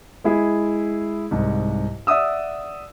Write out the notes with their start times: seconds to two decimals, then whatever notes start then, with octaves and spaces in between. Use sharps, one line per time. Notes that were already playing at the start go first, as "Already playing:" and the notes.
0.24 G#3 E4 G#4
1.31 C2 G#2
2.07 D5 E5 F#5 D#6 E6